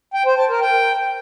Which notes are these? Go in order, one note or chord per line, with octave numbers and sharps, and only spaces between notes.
G5
C5
A5
A#4
G5